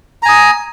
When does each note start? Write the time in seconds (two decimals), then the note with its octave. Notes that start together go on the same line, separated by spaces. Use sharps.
0.22 A#5
0.26 G#5
0.29 D#6